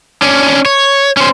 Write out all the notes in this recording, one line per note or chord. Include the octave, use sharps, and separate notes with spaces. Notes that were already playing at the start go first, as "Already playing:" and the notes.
C#4 D4
C#5
C#4 C5